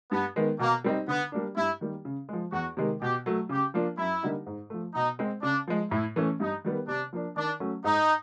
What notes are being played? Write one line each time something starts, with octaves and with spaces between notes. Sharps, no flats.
G2 B3
D#3 G#3 B3
B2 A#3
G3 C4 D#4
D3 B3
G3 A#3 D4
G2 E4
D#3 G3 A#3
C#3
F3 G#3
E2 F#4
C3 D#3 G#3
B2 G4
F#3 A3
C#3 G4
F3 A#3 D4 F4
F#2 E4
D3 G3 A#3 D#4
G#2
F3 A3
B2 D#4
G#3 C4
C#3 D4
F3 G#3
A2 E4
E3 A3 C#4
G2 D#4
D#3 G3 B3
C3 D4
F3 A#3 D4
D#3 D4
F#3 A3 C#4
G#2 D#4